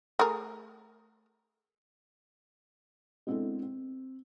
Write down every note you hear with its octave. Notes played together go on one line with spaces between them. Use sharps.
A3 G#4 A#4
G#3 B3 C4 D4 E4 A4
C4